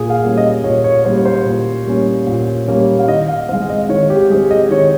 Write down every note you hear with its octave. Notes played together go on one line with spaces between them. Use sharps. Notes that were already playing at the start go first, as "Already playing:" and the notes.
Already playing: A#2 G#4
F5
G3 A#3 C#4
D#5
A#2 C#5
C#5
G3 A#3 C#4 C5
C5
A#2
G3 A#3 C#4
A#2
G3 A#3 C#4
F5
D#3 D#5
F5
G#3 C4 F5
D#5
D#3 C#5
G4
G#3 C4 G#4
D#5
D#3 C#5